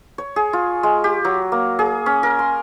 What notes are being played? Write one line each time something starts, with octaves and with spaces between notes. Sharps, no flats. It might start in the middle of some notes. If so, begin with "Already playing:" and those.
C#5
G#4
F4
G#3
G4
F#3
A#3
G#4
C#4
A#4
C6